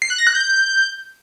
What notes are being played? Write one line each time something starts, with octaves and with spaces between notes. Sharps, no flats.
C7
F#6
A#6
F#6
G6